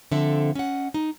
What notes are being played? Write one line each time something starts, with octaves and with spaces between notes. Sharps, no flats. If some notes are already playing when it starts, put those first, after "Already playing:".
D3 F3 C4 A4 E5 G5
C#4 D#5 F#5
D#4